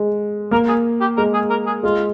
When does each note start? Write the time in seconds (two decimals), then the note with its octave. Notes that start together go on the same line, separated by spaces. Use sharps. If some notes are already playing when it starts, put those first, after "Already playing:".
Already playing: G#3
0.51 A#3 A#4
0.68 G#4
1.01 G4
1.17 G#3 A#4
1.34 G#4
1.50 A#4
1.66 G#4
1.84 G#3 F4